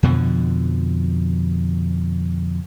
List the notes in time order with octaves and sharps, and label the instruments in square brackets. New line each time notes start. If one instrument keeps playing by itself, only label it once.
[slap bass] F2 B2 D3 F3